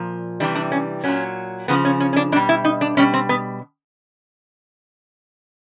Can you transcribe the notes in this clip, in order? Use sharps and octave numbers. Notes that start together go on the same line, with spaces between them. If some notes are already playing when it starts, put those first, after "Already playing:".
Already playing: A#2 F3
C3 E3 G3 D4
D4
C#4
A#2 F#3 C#4
C#3 F3 B3
C#4
C#4
C#4
D4
B2 G3 D4
E4
D#4
D4
B2 G3 C#4
C4
B3